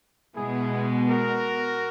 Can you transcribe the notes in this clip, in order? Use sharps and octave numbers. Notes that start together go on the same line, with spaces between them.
B2 G#3 B3 E4 G#4
F#4 A#4